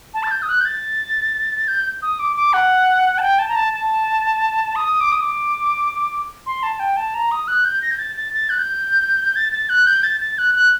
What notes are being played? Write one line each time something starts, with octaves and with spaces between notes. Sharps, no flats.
A5
A6
G6
D#6
F#6
G6
A6
G6
D#6
D6
D6
F#5
A5
G5
A5
A#5
A5
A5
D#6
D6
D#6
D6
C6
A5
G5
A5
A#5
D#6
F#6
G6
A#6
G6
A6
A6
A6
F#6
G6
A6
A6
F#6
G6
A6
A6
F#6
F#6